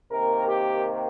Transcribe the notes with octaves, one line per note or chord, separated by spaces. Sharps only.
C3 D#3 A#3 A#4
G4